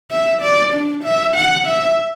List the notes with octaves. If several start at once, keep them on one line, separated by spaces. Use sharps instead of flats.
E5
D5
D4
E5
F#5
E5